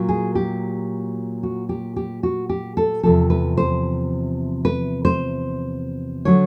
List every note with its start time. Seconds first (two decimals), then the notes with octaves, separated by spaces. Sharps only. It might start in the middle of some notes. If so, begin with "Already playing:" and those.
Already playing: A#2 F#3
0.09 G#4
0.35 G4
1.43 F#4
1.69 G4
1.96 G4
2.23 F#4
2.49 G4
2.77 A4
3.03 E2 C3 F3 A4
3.30 B4
3.57 C5
4.65 B4
5.05 C5
6.25 D3 F#3 C#5